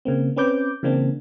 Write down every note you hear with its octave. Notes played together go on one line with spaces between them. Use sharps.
C#3 A#3 C4
C4 C#4 B4 D6 G6
C#3 E3 A#3 C4 D4